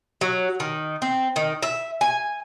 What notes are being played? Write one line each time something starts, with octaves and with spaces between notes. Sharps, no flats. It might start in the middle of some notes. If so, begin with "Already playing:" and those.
F#3
D#3
C4
D#3
E5
G#5